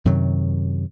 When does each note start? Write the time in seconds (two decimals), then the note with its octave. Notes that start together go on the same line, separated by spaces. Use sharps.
0.05 F#2 C3 D#3 F#3